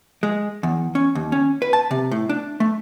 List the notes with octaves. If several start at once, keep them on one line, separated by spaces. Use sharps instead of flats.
G#3
E2
C#4
D#2
C#4
B4
A5
C3
A2
D4
A3